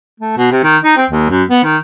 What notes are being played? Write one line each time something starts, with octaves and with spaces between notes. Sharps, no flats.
A3
B2
C3
D#3
D#4
C4
D#2
F#2
B3
D#3